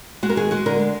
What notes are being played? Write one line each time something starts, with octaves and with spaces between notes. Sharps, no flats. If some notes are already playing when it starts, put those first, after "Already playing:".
G#3 F#4
A#4
D#3 G#4
G#3 F#4
D3 A#4
G#3